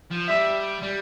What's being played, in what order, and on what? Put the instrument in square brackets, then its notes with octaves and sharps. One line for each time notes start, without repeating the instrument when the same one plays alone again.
[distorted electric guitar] F3
[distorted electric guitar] G3 [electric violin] E5
[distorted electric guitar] G3